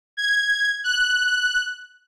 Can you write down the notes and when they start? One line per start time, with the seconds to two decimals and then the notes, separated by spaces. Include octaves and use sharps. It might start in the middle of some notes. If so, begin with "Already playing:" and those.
0.17 G#6
0.84 F#6